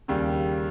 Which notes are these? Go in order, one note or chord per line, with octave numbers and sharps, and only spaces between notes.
D#2 C#3 G3